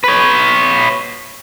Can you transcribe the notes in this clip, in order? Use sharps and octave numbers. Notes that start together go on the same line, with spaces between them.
B4 C#5